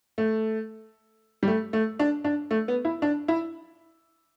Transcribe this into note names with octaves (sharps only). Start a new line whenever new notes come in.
A3
G3
A3
A3
D4
D4
A3
B3
E4
D4
E4